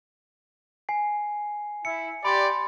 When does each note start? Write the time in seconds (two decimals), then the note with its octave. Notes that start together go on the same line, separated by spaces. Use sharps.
0.89 G#5 C7
1.85 E4 C#7
2.25 G4 D5 B5 C6 A6